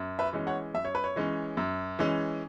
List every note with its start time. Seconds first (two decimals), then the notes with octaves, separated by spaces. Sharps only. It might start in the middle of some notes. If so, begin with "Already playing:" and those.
Already playing: F#2
0.19 B4 E5
0.33 E3 G#3 C#4
0.47 C#5 F#5
0.74 F#2 E5
0.85 C#5
0.95 B4
1.04 C#5
1.16 E3 G#3 C#4
1.57 F#2
1.99 E3 G#3 C#4